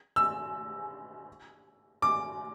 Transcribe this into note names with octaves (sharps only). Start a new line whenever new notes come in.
E6
D6